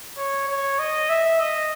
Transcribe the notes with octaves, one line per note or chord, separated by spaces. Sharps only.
C#5
C#5
D#5
E5
D#5